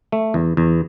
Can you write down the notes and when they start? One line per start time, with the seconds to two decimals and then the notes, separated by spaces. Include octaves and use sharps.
0.12 A3
0.34 E2
0.57 E2